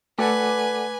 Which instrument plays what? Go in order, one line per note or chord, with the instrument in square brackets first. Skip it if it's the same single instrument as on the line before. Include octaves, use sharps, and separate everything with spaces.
[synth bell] A3 D6 [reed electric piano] A4 D5 F#5 [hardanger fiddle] B4 G#5